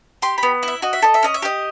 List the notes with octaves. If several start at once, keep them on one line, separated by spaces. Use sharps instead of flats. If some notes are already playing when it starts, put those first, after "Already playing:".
G4 C6
B5
B3
E4 E5
F#4 D#5
E5
A4 D#5
E5
C#4 D#5
E5
G4 D#5